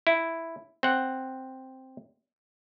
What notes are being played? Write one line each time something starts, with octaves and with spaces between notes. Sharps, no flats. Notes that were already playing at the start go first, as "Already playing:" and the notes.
E4
C4 F#5